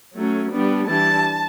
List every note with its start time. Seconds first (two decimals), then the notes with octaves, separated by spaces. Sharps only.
0.15 F#3 A3 C#4
0.52 G3 B3 D4
0.87 E3 G3 D4 A5